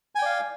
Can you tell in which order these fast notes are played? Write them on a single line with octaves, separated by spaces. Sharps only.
G#5 G5 D5 F5